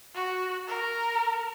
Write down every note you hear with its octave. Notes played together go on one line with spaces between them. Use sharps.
F#4
A#4